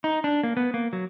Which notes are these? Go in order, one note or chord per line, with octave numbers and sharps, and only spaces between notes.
D#4
D4
A#3
B3
A#3
F#3